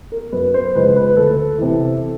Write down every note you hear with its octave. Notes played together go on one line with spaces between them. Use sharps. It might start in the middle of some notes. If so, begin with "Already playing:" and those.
A#4
F#2 B4
C5
C#3 F3 G#3 B4
B4
D2 A4
C3 E3